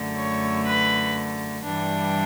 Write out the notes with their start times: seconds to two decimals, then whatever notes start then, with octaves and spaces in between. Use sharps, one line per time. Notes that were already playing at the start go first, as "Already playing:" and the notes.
Already playing: F#2 D3 A3
0.16 C#5
0.65 B4
1.63 G2 E3 G3 D4